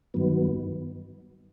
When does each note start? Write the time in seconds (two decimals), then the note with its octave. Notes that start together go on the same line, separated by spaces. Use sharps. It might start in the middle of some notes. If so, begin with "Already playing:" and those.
0.14 G2 D#3 F#3 B3